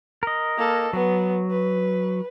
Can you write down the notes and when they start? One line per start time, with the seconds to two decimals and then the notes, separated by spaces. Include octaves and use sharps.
0.23 A#4 D#5
0.58 A#3 A4
0.93 F#3 B3
1.51 B4